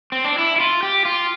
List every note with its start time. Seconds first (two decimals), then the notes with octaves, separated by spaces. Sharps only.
0.12 C4
0.25 D4
0.38 E4
0.56 E4
0.60 F4
0.83 G4
1.05 F4